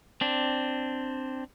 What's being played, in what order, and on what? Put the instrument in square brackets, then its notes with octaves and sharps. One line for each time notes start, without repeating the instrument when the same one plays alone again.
[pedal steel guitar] C4 D4